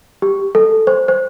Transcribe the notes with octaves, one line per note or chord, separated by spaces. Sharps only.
G4
A4
C5
C5